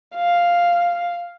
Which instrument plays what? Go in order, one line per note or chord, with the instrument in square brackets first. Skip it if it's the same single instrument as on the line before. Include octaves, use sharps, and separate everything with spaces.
[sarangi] F5